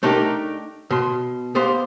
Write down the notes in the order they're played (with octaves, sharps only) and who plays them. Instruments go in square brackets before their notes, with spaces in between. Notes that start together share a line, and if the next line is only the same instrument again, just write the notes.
[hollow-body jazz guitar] A3 D4 D#4 F#4 G4 A#4
B2 C6
B3 G4 C5 F5